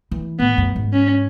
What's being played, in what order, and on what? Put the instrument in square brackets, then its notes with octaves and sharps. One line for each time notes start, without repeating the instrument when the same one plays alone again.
[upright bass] E3
[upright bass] A2 [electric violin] B3
[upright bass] F#2
G#2
[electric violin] C#4